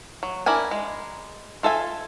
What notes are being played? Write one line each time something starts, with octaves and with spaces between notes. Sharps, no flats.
F#3
D4 E4 A#4 G#5
G#3
F4 A4 E5 G#5